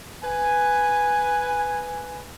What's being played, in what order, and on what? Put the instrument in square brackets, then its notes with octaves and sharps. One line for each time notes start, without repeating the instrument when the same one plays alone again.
[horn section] B4 G#5